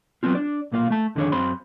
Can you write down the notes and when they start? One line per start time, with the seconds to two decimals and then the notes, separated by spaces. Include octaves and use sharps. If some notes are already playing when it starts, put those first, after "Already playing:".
0.23 F#3 A3 B3 C4 F4
0.35 D4 D5
0.72 B1 A#2 A#3 F4 F5
0.90 A3 A5
1.15 F2 D3 D#3 D4 G#4 C#5
1.32 F#2 C4 C5 B5 C6